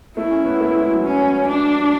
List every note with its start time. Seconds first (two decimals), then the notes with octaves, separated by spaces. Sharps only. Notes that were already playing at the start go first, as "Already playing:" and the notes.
0.16 A3 E4
0.31 C#4
0.46 B3
0.60 A3
0.75 G#3
0.90 F#3
1.04 C#4
1.48 D4